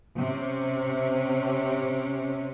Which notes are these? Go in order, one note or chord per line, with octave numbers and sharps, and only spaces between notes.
C3 C#4